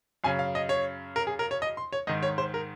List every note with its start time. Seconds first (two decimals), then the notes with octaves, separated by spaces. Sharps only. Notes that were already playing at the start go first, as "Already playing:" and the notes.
0.24 F#2 C#3 G#5
0.39 F5
0.55 D#5
0.69 C#5
1.16 A#4
1.27 G#4
1.39 A#4
1.51 C#5
1.62 D#5
1.77 C6
1.93 C#5
2.07 G#2 D#3 D#5
2.23 C#5
2.38 C5
2.54 A#4